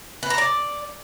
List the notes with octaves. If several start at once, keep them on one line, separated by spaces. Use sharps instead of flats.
B4
A#5
D5